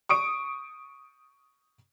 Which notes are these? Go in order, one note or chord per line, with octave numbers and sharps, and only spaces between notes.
C#6 D#6 D7